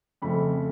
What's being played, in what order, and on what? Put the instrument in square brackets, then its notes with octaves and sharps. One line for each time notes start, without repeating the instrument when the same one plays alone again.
[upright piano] F2 C#3 F3 A3 C4 B5